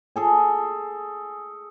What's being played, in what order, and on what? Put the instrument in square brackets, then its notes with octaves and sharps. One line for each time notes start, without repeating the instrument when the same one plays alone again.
[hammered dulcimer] G#4 A4 G#5